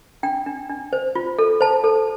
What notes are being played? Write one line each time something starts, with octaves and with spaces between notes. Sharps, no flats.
D4 G5
D4
D4
C5
F4
A4
C5 A5
A4